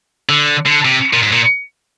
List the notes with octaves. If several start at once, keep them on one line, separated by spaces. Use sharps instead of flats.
D3
D3
C3
A#2
G#2
A#2